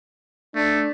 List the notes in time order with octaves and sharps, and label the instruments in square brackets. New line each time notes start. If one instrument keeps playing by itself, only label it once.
[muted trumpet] A3 [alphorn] D4